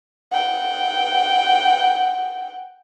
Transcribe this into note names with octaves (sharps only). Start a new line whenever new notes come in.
F#5 G5